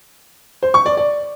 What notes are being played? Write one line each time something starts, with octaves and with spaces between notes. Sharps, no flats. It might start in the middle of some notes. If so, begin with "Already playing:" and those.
C5
C#6
D5
D5